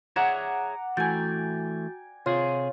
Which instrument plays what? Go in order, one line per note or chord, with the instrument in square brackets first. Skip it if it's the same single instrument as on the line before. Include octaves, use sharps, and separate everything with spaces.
[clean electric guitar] G#4 C#5 E5 [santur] D5 F#5 A#5
[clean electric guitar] E3 A3 [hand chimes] F#4 G6 A6 [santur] G5 G#5
[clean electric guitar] C3 G#4 [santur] F4 [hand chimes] C#5